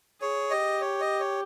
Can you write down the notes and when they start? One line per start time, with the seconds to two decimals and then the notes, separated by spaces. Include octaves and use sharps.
0.21 G#4 C#5
0.51 G4 D#5
0.81 C#5
1.01 D#5
1.20 C#5